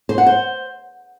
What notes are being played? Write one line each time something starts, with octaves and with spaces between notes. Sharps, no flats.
C5
F#5
C5